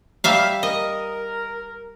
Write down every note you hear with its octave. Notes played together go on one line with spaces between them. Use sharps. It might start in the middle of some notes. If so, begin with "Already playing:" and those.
G3 E5 F5
A#4 D#5